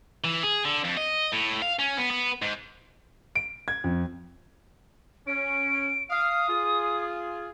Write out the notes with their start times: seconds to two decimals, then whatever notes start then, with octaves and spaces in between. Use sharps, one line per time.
0.24 E3
0.43 G#4
0.65 D3
0.84 F2
0.97 D#5
1.33 A2
1.62 F5
1.79 C#4
1.98 B3
2.11 B3
2.42 G#2
3.35 D7
3.68 G#6
3.84 F2
5.27 C#4 D7
6.10 F5 D#6
6.48 F4 G#4